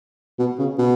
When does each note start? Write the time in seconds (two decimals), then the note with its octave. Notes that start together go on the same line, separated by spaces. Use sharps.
0.39 B2
0.58 C#3
0.78 B2